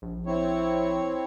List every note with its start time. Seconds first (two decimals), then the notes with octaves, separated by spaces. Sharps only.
0.02 A#1
0.26 C4 E4 C#5